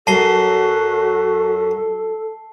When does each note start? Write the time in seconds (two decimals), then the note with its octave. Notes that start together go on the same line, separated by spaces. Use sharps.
0.07 F#2 F#4 A4 A5 C7 G7